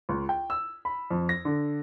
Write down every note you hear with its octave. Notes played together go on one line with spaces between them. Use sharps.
C#2
G5
E6
B5
F2
A#6
D3